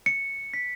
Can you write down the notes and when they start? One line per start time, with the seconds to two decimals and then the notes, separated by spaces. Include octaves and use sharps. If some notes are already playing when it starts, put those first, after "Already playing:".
0.06 C#7
0.54 B6